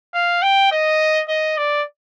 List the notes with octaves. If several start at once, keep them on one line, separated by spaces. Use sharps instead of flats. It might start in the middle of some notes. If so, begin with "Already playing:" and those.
F5
G5
D#5
D#5
D5